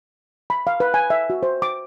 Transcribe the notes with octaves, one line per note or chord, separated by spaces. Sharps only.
B5
F5
B4
G#5
E5
F#4
C5
D6